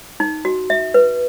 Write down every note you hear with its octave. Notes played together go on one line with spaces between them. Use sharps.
D#4
F#4
E5
B4